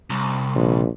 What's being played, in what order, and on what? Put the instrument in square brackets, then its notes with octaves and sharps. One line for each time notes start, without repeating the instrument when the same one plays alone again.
[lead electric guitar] C2
[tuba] A#1